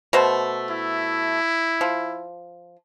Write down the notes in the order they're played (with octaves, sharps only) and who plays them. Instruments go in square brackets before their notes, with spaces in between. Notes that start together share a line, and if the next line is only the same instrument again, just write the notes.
[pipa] B2 A3 C5
[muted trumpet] E4
[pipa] F3